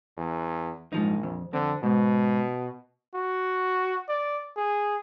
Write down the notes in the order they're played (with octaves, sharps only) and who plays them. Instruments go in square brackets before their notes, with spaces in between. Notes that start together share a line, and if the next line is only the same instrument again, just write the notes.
[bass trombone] E2
[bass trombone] A#1 [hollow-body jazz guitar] G#2 F3 D#4
[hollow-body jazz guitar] F2
[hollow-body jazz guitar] F2 C4 [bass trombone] D3
[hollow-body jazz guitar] G#2 [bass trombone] B2
[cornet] F#4
D5
G#4